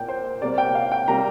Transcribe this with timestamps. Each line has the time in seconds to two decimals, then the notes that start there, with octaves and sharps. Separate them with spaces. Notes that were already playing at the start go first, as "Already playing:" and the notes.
Already playing: A#2 A#3 G5
0.08 C5
0.42 C3 G3 A#3 D5
0.58 G5
0.75 F5
0.92 G5
1.08 C3 G3 A#3 A#5